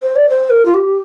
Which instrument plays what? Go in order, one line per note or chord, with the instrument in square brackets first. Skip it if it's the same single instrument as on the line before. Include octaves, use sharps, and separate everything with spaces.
[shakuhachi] C5
D5
C5
A#4
F4
G4